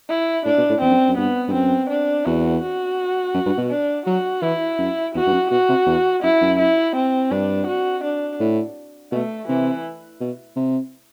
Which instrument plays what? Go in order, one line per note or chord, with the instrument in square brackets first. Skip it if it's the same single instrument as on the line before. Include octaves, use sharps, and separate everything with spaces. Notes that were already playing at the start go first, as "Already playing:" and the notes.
[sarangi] E4
[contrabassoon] A2 [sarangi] D4
[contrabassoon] B2
A2
[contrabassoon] E2 [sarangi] C4
[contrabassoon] F#2
F#2
[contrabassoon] G2 [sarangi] B3
[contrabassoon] G2
[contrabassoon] F#2 [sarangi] C4
[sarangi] D4
[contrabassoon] E2 [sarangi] F#4
[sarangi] F#4
[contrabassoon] F#2
G2
B2
[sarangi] D4
[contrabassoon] F#3 [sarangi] F#4
[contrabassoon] E3 [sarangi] E4
[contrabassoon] F#2
[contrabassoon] E2 [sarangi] F#4
[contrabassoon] G2
F#2
[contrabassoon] B2 [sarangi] F#4
[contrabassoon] C3
E2
[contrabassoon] F#2 [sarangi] E4
[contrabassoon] F#2
[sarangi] E4
C4
[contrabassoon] G2 [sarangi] D4
[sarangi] F#4
D4
[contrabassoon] A2
[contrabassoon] B2 [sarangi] A3
[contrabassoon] C3 [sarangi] E3
[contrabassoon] B2
C3